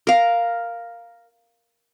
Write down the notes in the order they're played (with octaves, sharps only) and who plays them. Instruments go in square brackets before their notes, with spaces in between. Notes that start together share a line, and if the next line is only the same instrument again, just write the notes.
[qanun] A#4 F5